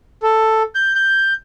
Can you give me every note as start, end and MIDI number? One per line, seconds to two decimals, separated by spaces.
0.23 0.63 69
0.75 0.93 91
0.96 1.33 91